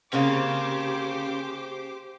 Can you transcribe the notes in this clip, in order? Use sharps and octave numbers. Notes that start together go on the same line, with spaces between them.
C#3 A#3 C4 C#4 G4 C5 F5 D6